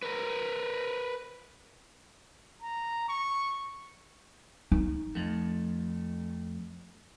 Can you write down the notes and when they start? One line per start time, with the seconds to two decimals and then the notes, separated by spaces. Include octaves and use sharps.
0.03 A#4 B4
2.62 A#5
3.09 C#6
4.72 D#4
5.15 F2 A3